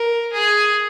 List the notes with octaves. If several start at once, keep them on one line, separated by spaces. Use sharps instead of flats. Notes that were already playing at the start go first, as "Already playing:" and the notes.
Already playing: A#4
G#4